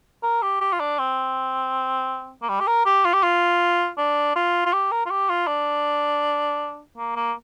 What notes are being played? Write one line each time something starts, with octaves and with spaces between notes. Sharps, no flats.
A#4
G4
G4
F4
D4
C4
A#3
G3
G4
A#4
G4
F4
G4
F4
D4
F4
F4
G4
A#4
F4
G4
F4
D4
A#3
A#3